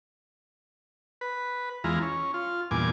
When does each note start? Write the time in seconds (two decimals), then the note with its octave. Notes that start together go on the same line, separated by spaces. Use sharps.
1.21 B4
1.84 E2 E3 G#3 F4 A#5
2.02 C#4
2.34 F4
2.71 E2 G2 A#2 G#5 D6